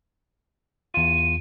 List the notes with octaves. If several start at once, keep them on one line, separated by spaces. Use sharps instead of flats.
E2 F4 D#7